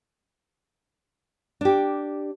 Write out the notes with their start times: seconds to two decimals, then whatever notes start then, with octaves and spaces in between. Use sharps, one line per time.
1.61 D4 G4